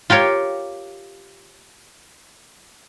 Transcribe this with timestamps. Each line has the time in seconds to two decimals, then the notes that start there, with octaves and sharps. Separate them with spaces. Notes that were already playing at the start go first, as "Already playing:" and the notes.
0.10 F4 G4 A#4 C#5